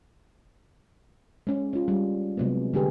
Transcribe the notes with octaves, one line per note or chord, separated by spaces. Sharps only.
G#3 C#4
C#4 F4
G3
C3 F#3 G#3 A#3 B3
D3 G#3 G4 G#4 B4